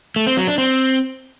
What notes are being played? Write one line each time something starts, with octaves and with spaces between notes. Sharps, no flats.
A3
C4
F#3
D4
C4